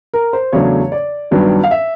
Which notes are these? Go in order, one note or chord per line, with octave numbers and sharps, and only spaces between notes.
A#4
C5
E2 C#3 F#3 A3 D4 C#5
D5
G2 D#3 F#3 B3 D4
F5
E5